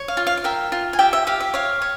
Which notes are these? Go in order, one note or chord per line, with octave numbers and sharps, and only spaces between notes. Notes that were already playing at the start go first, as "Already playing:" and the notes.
Already playing: C#5
F5
F4
F5
F5
A#4 E5 G5
F4
G#5
G4 E5 G5
E5 G5
G4 F5
E5
C#5 F5
C#5